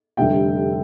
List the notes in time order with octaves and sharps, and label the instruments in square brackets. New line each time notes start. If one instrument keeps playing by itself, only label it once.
[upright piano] F1 D3 G3 E5 G5